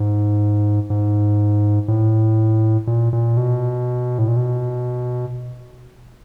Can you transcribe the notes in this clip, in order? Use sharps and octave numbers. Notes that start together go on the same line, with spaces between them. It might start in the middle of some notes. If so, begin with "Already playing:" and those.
Already playing: G#2
G#2
A2
A#2
A#2
B2
A2
A#2
B2